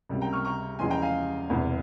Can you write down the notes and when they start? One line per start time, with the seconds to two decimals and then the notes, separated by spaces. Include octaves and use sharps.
0.09 C#2 C3 G3 A#3
0.21 G5 A#5
0.33 C#6 F6
0.45 A#5 C#6
0.79 E2 C#3 F3 G#3 G#5 C6
0.91 G5 A#5
1.02 F5 G#5
1.49 E1 E2 C3